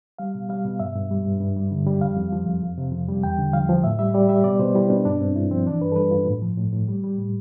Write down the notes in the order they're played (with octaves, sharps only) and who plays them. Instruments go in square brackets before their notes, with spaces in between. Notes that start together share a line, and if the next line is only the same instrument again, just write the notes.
[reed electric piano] G3 F5
B2
G3 F5
B2
G2 E5
G2
G3
G2
G2
G3
D3
G3
F2 F5
F2
F3
F2
F2
C3
F2
G3
E2 G5
D3
F3 F5
F3
A2 E5
G3 E5
G3 D5
G3 E5
B2 D5
B2 C5
G3 E4
B2 D4
G2 D4
G2 C4
G2 E4
F3 C4
E3 D4
G2 B4
A4
G3 B4
G2 F4
A2
F3
A2
A2
G3
G3
A2